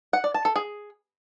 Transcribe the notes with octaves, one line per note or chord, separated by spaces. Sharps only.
F#5
D5
A5
A4
G#4